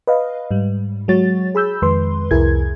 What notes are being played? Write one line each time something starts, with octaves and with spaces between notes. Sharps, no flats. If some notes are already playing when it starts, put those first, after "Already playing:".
B4 D#5 F5
G#2 G3
F#3 G#3 F#4 C#5 A6
G#4 B5 E6 G6
F2 D#3 G#3 B4 C6
C2 F2 E4 G#4 A#4 G#6